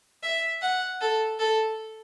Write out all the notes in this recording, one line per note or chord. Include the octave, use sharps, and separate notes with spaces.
E5
F#5
A4
A4